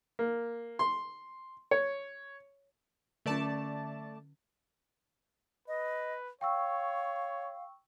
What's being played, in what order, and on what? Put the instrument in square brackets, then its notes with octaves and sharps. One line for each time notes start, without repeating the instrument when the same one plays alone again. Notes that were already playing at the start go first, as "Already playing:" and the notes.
[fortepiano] A#3
C6
C#5
[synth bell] D3 C#4 [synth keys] A3 D5 A5
[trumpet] B4 [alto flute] D#5
[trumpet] C#5 [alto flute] F5 [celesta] G5 C#6 E6